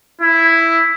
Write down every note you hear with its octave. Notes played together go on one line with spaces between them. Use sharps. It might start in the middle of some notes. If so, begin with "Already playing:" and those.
E4